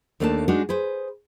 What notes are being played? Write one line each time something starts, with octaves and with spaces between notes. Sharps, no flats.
D#2 A3 A#3 D4 E5 A5
G#3 D4 D#4 F#4
G#4 B4 C5